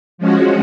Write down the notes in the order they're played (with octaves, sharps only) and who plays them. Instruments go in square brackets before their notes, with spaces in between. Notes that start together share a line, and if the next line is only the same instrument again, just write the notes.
[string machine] F3 G#3 C#4 F#4